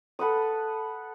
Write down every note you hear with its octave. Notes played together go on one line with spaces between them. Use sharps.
A4 B4 F#5 D#6